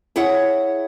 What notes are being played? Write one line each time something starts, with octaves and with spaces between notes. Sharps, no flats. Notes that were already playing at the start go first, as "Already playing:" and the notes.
E4 G#4 C#5 E5 F#5